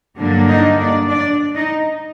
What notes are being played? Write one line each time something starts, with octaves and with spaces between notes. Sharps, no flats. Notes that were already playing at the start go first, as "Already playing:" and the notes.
G2 D3 F#3 A#3 D4
D#4 D#5
D4 D5
D4 D5
D#4 D#5